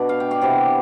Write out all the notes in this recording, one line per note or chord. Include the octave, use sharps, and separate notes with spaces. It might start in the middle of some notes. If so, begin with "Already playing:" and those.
Already playing: B2 B3 D4 D5
F5
G5
D5 F5
C3 E3 B3